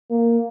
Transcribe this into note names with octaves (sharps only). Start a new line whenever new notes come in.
A#3